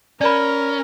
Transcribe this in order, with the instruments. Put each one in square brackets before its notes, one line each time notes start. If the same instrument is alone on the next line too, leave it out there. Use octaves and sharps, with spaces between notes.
[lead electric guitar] C#4 [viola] A#4 [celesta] D5 B5